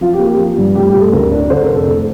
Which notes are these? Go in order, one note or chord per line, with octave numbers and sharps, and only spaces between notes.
F3 F4
G4
A#3
G4
F3
G2
A2 G4
G4
A2
A4
D2 A#4
D4
D3 C5
A#4
F1
A4
A2